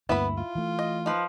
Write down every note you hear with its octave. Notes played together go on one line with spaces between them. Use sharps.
D2 G2 A#3 B3 E4 B5
F4
E3 A3
D#5
F3 D#4 B4